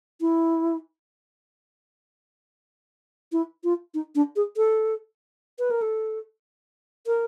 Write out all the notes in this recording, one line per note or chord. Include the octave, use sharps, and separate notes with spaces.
E4
E4
F4
D#4
D4
G#4
A4
B4
A#4
A4
A#4